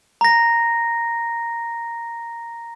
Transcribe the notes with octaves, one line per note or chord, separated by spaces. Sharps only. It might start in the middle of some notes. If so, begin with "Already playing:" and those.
A#5 A#6